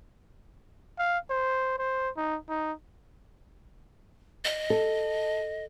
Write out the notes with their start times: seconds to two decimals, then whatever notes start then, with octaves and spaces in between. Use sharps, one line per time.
0.99 F5
1.30 C5
1.79 C5
2.17 D#4
2.49 D#4
4.45 D#5
4.70 A4